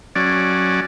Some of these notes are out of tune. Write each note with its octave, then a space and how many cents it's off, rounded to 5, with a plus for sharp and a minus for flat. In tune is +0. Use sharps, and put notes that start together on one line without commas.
F#3 +0 C#4 -10 D5 +0